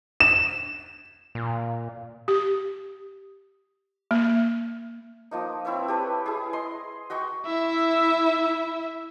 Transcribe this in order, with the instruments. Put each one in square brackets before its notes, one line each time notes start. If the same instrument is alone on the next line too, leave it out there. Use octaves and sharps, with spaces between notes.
[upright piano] E7
[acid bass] A#2
[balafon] G4
A#3
[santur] F3 A#3 D#4
C4 E4 C#5 E5
G4 A4 B4
E4 G#4
D#5 C6
F#4 D#5 G5 C#6
[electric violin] E4 E5